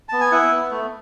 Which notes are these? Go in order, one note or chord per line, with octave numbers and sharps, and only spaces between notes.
B3 A5
G#5
E4 F#5
B3
A3